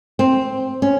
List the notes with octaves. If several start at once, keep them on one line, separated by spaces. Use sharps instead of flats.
C4
C#4